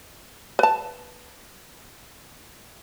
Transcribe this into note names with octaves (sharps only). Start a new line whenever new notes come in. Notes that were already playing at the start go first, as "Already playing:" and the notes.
B4 A5